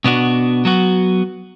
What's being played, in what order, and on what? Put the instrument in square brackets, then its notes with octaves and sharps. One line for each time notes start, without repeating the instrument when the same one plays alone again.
[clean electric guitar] B2 B3 D4 F#4
F#3 B3 F#4